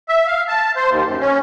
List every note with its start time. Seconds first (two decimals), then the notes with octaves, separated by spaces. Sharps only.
0.09 E5
0.27 F5
0.48 A5
0.76 C5
0.90 D#2
1.06 F#2
1.21 C#4